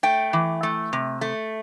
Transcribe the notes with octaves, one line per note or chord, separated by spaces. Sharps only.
A3 G5
E3
A3
C3
A3